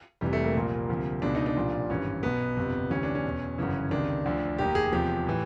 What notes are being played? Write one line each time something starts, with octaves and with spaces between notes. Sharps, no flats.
F1 F2 C3 E3 G3
A3
A#3
C2 A#2 F3
D2 C3 F3
C#2 B2 D4
D#4
D4
C2 A#2 F3
G#1 G2 E3 C#4
B1 B2 B3
G1 F2 C3
D2 C3 E3 C#4
D4
C#4
E2 B2
G1 F#2 C#3 E3
C#2 C3 D#3 D4
D2 D3 F3
F1 D#2 D#3 G4
G#4
E2 C3 F3 G4
A2 E3